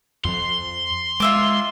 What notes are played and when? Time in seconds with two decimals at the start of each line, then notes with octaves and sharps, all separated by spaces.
0.24 F2 F3 C6
1.20 G#3 F4 E5 D6